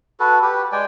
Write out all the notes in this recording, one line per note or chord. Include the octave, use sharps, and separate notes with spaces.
F#4 A4 B4
G4 B4
G#3 D5 G5 G#5